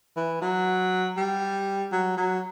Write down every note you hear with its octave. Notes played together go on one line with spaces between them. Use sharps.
E3
F#3
G3
F#3
F#3